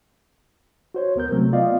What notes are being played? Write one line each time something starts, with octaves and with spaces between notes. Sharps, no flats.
F#4 C5 C#5
D2 B3 A#4 G6
C3 F#3 A3 C4
B3 F4 D5 D#5 F5